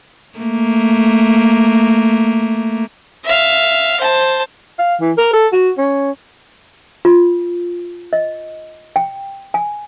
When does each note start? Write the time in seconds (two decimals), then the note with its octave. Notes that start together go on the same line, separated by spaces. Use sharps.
0.38 A3 A#3
3.25 E5 F5
4.00 C5 A5
4.79 F5
5.01 E3
5.18 A#4
5.34 A4
5.53 F#4
5.78 C#4
7.05 F4
8.13 D#5
8.96 G5
9.54 G#5